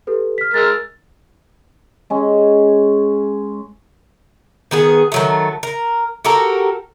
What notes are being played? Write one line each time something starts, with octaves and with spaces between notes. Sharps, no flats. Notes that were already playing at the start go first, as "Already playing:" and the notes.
G4 A4 B4
F6 B6
G#3 A#4 E6 A6
G#3 C#4
D#3 B3 G#4
D#3 F#3 A3
A#4
F#4 G4 A4 A#4